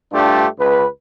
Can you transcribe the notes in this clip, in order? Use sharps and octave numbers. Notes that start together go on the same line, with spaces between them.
G2 A3 D4 F4 G4
C#2 B4